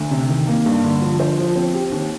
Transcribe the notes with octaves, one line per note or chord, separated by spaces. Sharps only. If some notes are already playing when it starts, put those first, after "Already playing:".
Already playing: D2
C3
D#3
A#3
G2
D3
F3
C5
F3
C4
G4
D#2